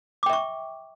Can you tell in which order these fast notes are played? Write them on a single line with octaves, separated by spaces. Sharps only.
D6 G5 E5 C#6